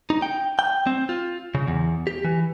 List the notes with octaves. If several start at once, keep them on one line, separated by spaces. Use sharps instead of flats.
D#4
G5
G5
C4
F4
C#3
E2
G4
E3